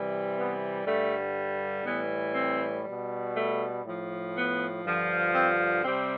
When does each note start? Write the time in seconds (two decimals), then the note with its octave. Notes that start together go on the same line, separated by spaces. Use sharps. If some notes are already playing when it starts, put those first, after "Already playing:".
Already playing: C3 E3 G3
0.35 B3
0.84 G2 D3 G3 A3
1.84 A2 E3 G3 B3
2.34 C4
2.84 B2 G3
3.34 A3
3.84 A2 F3
4.34 B3
4.83 G2 D3 F3
5.34 C4
5.83 C3 G3 C4